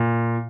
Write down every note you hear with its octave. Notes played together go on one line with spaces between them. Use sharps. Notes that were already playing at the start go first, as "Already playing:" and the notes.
Already playing: A#2